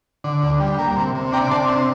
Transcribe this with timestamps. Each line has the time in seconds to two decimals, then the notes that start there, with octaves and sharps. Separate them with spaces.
0.24 D3
0.43 D2
0.60 G3
0.79 A#3
0.96 C3
1.15 C3
1.32 D4 G5 A#5
1.51 C3 A5 C6
1.69 C4